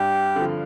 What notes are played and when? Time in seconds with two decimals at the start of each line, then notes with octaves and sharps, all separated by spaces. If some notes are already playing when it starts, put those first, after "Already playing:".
Already playing: G2 G4
0.36 D3 F3